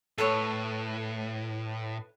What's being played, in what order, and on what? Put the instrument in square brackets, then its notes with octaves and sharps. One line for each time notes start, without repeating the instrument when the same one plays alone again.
[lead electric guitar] A2 [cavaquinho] A4 B4 C#5